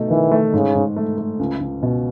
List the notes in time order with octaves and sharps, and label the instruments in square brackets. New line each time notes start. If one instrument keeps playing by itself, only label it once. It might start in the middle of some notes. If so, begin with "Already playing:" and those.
Already playing: [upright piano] B2 A3 D#4
[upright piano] D#3 [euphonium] E3
[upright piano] A3
[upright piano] G#2 [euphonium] C#3
[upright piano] G#2
A3
A3
C#2
C#2
B2